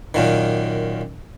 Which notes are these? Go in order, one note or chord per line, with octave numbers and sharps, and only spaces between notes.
F#2 A#2 D#3